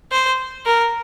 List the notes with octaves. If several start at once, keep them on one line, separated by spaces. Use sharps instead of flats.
C5
A#4